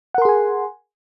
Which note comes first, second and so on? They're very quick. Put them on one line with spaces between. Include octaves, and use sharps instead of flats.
F#5 A#4 C6 G#4 G#5